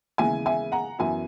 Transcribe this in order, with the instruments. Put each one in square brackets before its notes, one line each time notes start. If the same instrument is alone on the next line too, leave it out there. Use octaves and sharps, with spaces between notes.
[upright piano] D#2 C#3 E3 G#3 B3 E5 G#5
E5 G#5
F#5 A#5
F#2 E3 B3 E5 G#5